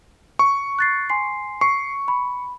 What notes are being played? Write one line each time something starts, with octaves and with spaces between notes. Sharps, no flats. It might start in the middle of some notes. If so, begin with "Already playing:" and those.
C#6
F#6 A6 C7
G#5 C6 C7
C#6 C7
B5